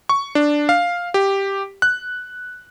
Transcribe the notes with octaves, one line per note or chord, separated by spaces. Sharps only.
C#6
D4
F5
G4
F#6